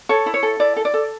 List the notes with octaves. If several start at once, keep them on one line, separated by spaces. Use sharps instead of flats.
A4 C#5
E4
C#5
A4
E4 D5
A4
D5
A4